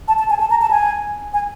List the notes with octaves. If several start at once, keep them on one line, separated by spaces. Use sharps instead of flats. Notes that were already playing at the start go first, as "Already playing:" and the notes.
A5
A5
G#5
A5
A#5
A5
G#5
G#5